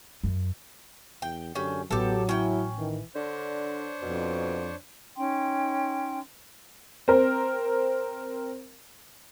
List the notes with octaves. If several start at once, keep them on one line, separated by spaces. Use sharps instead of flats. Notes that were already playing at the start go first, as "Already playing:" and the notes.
F#2
E2 G5
F#2 D3 C#4 G4
A1 F#3 B3 G4 A4
C#4 E4 G5
D#3 E3
D3 D4 C5 C#5
F2 B2
C#4 D#4 G5 C6
C4 A#4